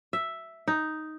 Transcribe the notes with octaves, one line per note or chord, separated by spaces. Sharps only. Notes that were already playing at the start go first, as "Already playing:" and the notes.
E5
D#4